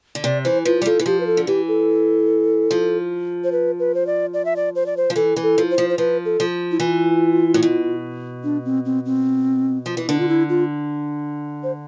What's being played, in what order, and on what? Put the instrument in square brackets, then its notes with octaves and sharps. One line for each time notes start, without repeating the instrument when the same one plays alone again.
[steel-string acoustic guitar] D3
[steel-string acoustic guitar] C3 [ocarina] D5
[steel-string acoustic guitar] E3 [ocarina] C5
[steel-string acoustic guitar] F3 [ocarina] B4
[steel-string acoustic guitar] G3
[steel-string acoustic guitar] F3 [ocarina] A4
[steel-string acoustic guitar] E3
[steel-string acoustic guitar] F3 [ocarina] G4
[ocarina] B4
A4
[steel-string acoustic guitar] D3
[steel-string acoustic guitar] E3 [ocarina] G4
[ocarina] A4
[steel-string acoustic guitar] F3
[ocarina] C5
B4
B4
C5
D5
D5
E5
D5
C5
D5
C5
[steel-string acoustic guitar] F3
[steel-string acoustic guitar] E3 [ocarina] A4
[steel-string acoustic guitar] E3
[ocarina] A4
[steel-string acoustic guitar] F3
[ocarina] C5
[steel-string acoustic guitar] F3
[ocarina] C5
[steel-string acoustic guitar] F3 [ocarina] B4
[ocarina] A4
[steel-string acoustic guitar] F3
[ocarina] E4
[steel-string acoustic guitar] E3 [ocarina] F4
[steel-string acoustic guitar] A2
B2
[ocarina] D4
C4
C4
C4
[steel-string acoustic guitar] F3
E3
[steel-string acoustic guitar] D3 [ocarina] D4
[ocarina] F4
E4
F4
C5